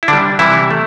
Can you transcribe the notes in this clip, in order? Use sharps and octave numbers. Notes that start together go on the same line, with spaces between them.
E4
D3 D4
G3
C3 E3 G3 E4
A3